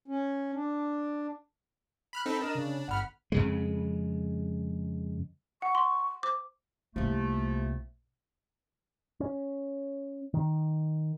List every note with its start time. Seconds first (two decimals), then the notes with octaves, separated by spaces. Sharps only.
0.08 C#4
0.54 D4
2.13 B5 F6 F#6
2.26 C4 D#4 A4 B5
2.41 D4 A#4 D#5 E7
2.55 C#3
2.88 G1 F#5 B5 F6
3.32 F2 C#3 G#3
5.62 F#5 C#6
5.75 C6
6.23 C5 D6
6.96 C2 C3 F3 A3 A#3
9.20 C#4
10.34 D#3